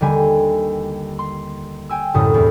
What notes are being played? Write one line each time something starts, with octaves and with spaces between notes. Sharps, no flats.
D#2 D3 G3 G#5
C6
G5 G#5 E6
C2 F#2 A2 D3 D#6
E2